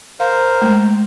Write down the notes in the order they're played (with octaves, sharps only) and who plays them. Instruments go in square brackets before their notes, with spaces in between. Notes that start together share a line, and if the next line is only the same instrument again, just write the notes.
[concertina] A#4 C5 [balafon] F5
[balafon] G#3 A3